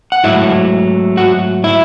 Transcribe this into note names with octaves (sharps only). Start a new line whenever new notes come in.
F#5
G#2 F#3 A3 E4 E5
F#4 F#5
E4 E5